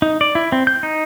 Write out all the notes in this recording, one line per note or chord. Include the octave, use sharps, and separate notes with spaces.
D#4
D5
E4
C4
G6
D#4